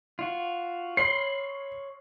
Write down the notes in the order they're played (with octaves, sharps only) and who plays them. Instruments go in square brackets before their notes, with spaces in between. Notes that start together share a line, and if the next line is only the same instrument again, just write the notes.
[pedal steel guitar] F4 F#4
[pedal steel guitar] C#5 B5 C6 [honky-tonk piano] C7